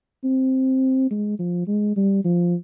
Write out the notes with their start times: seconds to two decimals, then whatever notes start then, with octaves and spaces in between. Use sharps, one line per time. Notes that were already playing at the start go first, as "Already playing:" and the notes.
0.24 C4
1.11 G#3
1.39 F3
1.67 G#3
1.97 G3
2.25 F3